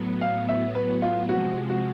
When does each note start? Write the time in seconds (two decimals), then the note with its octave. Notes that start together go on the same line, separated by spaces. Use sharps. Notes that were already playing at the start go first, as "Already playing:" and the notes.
Already playing: A2 F#3 B3
0.21 F5
0.49 E5
0.75 B4
1.02 F4
1.29 C3 F3 G#3 F#4
1.70 F#4